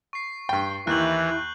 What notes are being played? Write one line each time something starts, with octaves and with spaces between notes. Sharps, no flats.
C#6 C7
G2 G5
D#2 E3 E4 F#6 G6 F#7